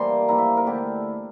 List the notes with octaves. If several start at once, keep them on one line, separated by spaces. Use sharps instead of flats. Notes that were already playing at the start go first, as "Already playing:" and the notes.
Already playing: E3 G3 A#3 D4 C5 G5 C6
D6
F3 A#3 E4 A#5
E5
A#4
D3 A3 E4 G4